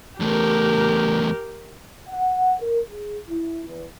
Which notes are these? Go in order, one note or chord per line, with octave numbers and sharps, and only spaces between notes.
E2 A3 G4 A#4
F#5
A#4
G#4
E4
E2